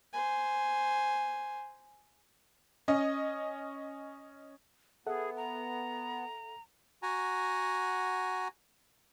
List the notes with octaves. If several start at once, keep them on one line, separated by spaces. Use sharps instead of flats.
C5 G#5
C#4 D#5
B3 G#4 A4 E5 F#5
A#5
F#4 F#5 G#5 A#5